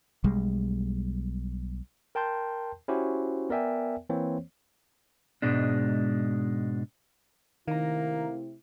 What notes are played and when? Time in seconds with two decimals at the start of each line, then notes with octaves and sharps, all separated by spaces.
0.24 B1 G3 G#3
2.15 A#4 G5 A5 C6 G6
2.88 C#4 E4 F#4 G4 C5
3.49 B3 A#4 D5 E5 G5 G#5
4.10 E3 A#3 C4 C5 C#5
5.42 G#2 B2 G#3 D4
7.68 C3 D#3 A3 A#3 E4 A#5